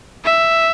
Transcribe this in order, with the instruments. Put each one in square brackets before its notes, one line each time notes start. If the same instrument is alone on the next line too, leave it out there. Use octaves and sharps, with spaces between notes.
[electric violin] E5